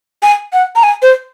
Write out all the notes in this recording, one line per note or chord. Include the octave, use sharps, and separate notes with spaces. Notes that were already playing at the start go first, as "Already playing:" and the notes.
G#5
F#5
A#5
G#5
C5